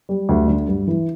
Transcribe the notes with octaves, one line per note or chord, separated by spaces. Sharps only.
G3
D2
D3
G2
E3